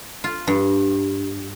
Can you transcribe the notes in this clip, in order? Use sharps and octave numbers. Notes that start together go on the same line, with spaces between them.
F4
G2